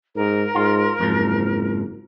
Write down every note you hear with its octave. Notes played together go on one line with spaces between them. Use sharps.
G#2 A#4
G#2 F4
F#1 F2 G#2 F3